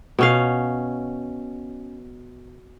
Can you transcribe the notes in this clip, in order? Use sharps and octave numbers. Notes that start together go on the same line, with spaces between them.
B2 C#4 F5